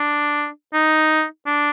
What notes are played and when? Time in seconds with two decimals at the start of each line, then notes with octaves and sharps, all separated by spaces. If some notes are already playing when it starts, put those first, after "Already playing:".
Already playing: D4
0.73 D#4
1.46 D4